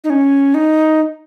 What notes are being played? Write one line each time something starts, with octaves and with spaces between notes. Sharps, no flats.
D#4
C#4
D#4